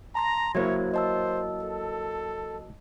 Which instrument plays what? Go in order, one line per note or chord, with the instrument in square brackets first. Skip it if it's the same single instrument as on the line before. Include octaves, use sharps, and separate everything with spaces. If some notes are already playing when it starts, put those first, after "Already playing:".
[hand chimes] A5 C6 A#6 [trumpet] A#5
[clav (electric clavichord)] F#3 A#3 E4 [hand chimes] C5 E5 G#6 [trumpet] C#5
[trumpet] C5 [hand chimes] D#5 A5 E6
[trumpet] A4